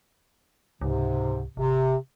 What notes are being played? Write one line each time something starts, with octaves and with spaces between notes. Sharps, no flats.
C#2 G#2 C3
G#1 C3